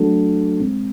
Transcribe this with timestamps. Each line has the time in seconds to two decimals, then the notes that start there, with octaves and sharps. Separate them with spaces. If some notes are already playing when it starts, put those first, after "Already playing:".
Already playing: F#3 A3 D4 F#4 A4
0.60 B2 G#3 C4